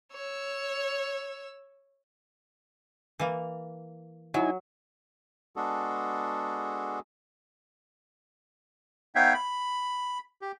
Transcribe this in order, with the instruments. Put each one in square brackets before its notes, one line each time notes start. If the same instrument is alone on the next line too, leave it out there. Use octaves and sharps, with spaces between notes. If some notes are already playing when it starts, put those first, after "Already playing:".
[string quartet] C#5 E6
[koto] E3 A#3
[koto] F#3 [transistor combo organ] D#4 E4 G#5
[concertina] G#3 B3 D4 F#4 G#4 A4
B3 D#4 C#5 E5 F5 G5
B5
G4